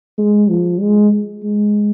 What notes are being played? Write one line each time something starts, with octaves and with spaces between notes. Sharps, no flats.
G#3
F3
G#3
G#3